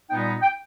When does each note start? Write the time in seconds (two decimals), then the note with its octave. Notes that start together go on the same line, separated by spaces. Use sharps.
0.10 A#2 G3 B3 D#4 G5
0.42 G5